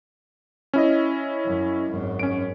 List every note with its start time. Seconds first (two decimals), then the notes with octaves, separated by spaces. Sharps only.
0.74 C#4 E4 D#5
1.45 F#2
1.89 G#1 F#2
2.19 C#4 D7